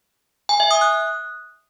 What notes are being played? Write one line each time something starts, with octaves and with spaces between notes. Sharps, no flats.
G#5
E5
D#6
F#6